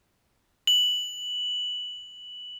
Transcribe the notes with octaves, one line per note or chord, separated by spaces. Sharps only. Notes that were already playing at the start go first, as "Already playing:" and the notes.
F#7